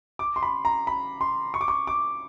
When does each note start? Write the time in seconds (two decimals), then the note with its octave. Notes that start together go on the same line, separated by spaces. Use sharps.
0.19 D6
0.36 C6
0.43 B5
0.65 A#5
0.87 B5
1.21 C6
1.54 C#6
1.61 D6
1.68 C#6
1.87 D6